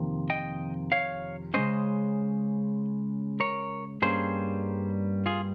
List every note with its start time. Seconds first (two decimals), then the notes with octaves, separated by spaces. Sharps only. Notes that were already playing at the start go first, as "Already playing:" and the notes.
Already playing: F2 C3 D#3 A#3
0.30 D#5 G5
0.92 C#5 F5
1.54 C#3 G#3 C#4 C5 D#5
3.40 A#4 C#5
4.02 G2 G3 A#3 C#4 G#4 C5
5.26 F4 G#4